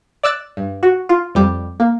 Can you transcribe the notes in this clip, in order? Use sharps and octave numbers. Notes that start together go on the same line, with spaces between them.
D5 E6 F#6 A6
G2
F#4
F4
F2 G3
A#3